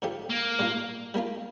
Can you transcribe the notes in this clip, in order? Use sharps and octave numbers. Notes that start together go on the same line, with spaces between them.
D3 F3 D4 G4
A#3
A#2 G3 D4 F4
G3 A#3 D4 F4